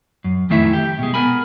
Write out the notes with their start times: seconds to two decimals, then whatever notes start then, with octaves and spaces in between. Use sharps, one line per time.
0.24 F#2
0.50 F2 D#3 A3 E4 E5
0.73 G4
0.99 B2 G#3
1.14 B3 A#4 G#5 B5